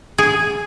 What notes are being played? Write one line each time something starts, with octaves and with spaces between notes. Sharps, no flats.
G#4